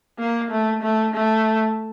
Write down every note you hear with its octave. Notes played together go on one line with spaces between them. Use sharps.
A#3
A3
A3
A3